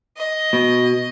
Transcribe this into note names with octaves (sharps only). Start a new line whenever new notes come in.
D#5
B2